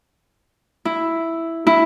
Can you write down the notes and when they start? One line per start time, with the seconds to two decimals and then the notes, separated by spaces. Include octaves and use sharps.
0.85 E4
1.67 E4